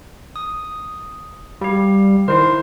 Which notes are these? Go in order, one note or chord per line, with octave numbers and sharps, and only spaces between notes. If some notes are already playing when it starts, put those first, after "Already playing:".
D#6
G3 G4 F5
D#3 E4 A#4 C5